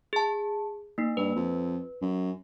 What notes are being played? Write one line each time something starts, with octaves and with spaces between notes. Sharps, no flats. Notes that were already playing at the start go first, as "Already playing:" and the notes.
G#4 A5
A#3 D#4
G2 B4
F2
F#2